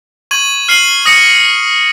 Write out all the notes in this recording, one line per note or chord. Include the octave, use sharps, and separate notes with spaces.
C#6 G#6 D#7 F#7
F6 C7 D#7 F#7
D#6 A#6 C#7